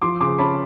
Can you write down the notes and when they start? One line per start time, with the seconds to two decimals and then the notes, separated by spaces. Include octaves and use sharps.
0.02 F3 C6 D6
0.20 C#3 C6 D6
0.38 C#4 A5 B5